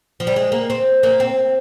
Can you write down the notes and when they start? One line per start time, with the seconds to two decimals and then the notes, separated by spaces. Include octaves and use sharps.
0.20 F3
0.27 G3
0.36 G#3
0.52 A#3
0.70 C4
1.03 A#3
1.20 C4